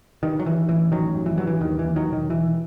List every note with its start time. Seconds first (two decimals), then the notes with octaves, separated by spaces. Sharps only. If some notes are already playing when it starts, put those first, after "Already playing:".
0.23 G2 D#3
0.40 F#3
0.46 G2 E3
0.69 A1 E3
0.92 A1 D#3 F#3
1.15 G2
1.26 E3
1.38 G2 F#3
1.47 E3
1.61 D#2 D#3
1.79 E3
1.85 D#2
1.96 D#3 F#3
2.08 E1
2.13 D#3
2.30 E1 E3